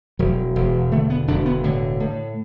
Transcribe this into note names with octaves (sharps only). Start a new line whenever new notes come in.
E1 F#3
E1
D3 A3
B3
E1 D4
B3
A2 D3
A2